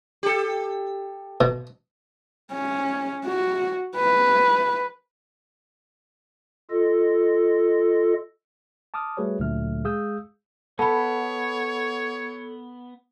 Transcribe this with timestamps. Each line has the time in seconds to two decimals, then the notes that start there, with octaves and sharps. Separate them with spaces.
0.23 G4 A4
1.41 B2
2.51 C#4
3.26 F#4
3.96 B4
6.71 F4 A4 D#5
8.94 A5 D6 D#6 F6
9.17 G3 A3 F#4 G#4 B4 C#5
9.39 D2 A#2 D3 F#3 A3 F6
9.84 G#3 G#4 F5 D#6 E6 G6
10.79 B3 A4 C#5 A5 B5